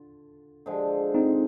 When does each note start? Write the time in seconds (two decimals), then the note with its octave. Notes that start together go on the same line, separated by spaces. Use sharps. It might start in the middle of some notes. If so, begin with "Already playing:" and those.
Already playing: D3 F4
0.66 D3 F3 G#3
1.15 C4 D#4